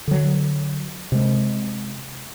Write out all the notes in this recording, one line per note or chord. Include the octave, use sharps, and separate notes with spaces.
D3 F#3
C3 G#3